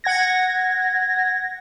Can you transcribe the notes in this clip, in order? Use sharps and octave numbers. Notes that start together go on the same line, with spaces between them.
F#5 G#6 A#6